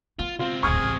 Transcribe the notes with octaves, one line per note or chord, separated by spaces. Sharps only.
B3 F4
C#2 C4 F4
D1 G2 G#4 C#6 F6 G#6
A1